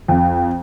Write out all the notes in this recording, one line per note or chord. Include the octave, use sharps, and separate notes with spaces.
F2